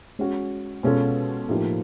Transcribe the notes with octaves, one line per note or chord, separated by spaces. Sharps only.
G#3 C#4 F#4
B2 G#3 C#4 F4 A4
A2 F3 A#3 D#4 G4